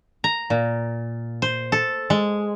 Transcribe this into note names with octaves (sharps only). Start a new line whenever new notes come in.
A#5
A#2
C5
A4
G#3